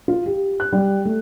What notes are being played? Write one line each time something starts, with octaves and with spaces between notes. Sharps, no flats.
F4
G4
F#6
G3
A3